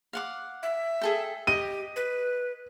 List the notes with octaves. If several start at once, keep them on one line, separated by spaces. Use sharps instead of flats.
F5 F#5 D6
E5
G#4 A4 G5
G4 D#5 D#7
B4